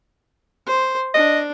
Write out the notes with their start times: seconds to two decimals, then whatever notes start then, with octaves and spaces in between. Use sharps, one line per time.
0.66 C5
1.14 D4 D#5